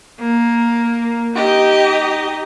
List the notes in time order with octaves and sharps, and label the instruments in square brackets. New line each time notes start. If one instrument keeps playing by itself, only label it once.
[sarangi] A#3
[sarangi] D#4 [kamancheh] G4 D#5